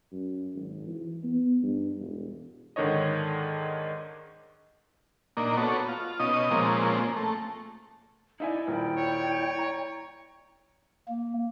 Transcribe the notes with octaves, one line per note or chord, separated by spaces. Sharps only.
F#2
G#1
E3
B3
G2
E1
G#2 D3 D#3 D4 C#5 D#5
A#2 A#3 D4 D#4
B3 F#4 A4 C#5
F4
B2 C#4 D#4 D#5 D#6
A#2 F3 G#3 A#3 C4 C#4
A3
D#4 E4 D5 E5 G#5
D#1 D5 E5 G5
C#5
A#5
A#3